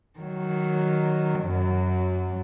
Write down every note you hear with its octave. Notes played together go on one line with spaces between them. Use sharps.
D#3 F#3
F#2 F#3